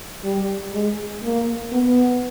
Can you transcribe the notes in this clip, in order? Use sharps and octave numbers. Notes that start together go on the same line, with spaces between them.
G3
G#3
A#3
B3